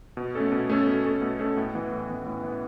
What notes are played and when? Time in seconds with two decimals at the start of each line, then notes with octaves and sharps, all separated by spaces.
0.17 B2
0.35 A3 C#4 A4
0.52 B2
0.70 A3 C#4 A4
0.86 B2
1.05 A3 C#4 A4
1.22 B2
1.39 A3 C#4 A4
1.57 A2
1.74 E3 B3
1.92 A2
2.09 E3 B3
2.26 A2
2.43 E3 B3